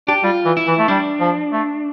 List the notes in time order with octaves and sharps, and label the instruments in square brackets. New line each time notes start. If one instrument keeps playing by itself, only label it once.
[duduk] D4 [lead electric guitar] G4
[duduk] G3 [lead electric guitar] F4
[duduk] E3
[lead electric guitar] E4
[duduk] E3
A3
[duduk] G3 [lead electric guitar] D4
[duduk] F3
A3